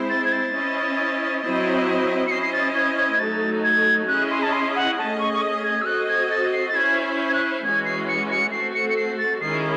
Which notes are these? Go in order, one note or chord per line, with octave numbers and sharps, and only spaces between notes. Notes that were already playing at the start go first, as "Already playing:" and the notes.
Already playing: G#3 C4 E4 C5
A6
G#6
A6
C#4 E4 C5 D#5
F#3 C4 E4 C5 D#5
C#7
C#4 E4 C5 D#5 C7
C7
A6
G#6
G#6
G#6
F#3 A3 D#4 F#4 A4 A6
G#6
C#4 E4 G#4 D#5 F#6
C6
A5
C6
F#5
A3 C#4 G#4 D#5 A5
C#6
C#6
D#6
G#6
E6
C4 F#4 A4 D#5 F#6
G#6
A6
C7
A6
C#4 E4 C5 G#6
G#6
F#6
E3 G#3 C#4 F#4 G#6
C7
C#7
C#7
A3 C4 F#4 A4 C7
C#7
C#7
C7
A6
D#3 G#3 C#4 E4 G#4 C7